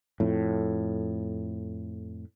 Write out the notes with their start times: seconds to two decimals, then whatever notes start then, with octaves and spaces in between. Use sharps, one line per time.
0.20 F2 A2